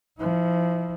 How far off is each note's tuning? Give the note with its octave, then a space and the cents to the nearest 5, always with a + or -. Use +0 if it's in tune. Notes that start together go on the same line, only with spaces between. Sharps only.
F3 -20 E4 -40